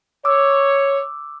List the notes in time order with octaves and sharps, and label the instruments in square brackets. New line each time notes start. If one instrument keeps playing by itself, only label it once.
[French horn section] C#5 [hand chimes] D6 E6